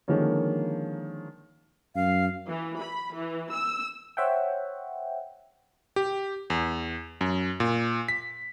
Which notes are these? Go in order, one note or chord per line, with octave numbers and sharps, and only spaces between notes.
D3 D#3 F3 G#3 A#3 C#4
F#2 F5
E3
B5
E3
E6
C5 C#5 E5 F#5 G5
G4
E2
F#2
A#2
B6